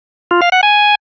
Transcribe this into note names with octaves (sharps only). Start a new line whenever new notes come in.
F4
F5
F#5
G#5